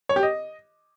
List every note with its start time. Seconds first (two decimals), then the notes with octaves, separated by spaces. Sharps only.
0.09 C#5
0.16 G4
0.23 D#5